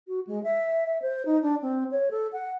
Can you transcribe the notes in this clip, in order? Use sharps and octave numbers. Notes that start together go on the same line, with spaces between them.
F#4
G#3
E5
E5
C5
D#4
D4
C4
C#5
A4
F#5